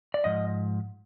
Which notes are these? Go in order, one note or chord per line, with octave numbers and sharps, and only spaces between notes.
D5
G#2 F3 D#5